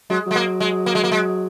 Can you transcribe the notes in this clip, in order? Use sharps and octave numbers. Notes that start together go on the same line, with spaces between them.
F#3 G#3
F#3 G#3
A#3
G#3
A#3
G#3
A#3
G#3